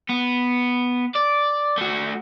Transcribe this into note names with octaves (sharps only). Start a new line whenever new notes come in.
B3
D5
A3 F#4